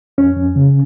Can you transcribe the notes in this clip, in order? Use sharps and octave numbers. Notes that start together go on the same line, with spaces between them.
F2 C#4
F2
C#3